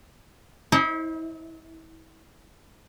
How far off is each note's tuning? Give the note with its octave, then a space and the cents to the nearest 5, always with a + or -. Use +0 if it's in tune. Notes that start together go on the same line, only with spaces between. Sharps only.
E4 -35 C5 +30 D#5 +0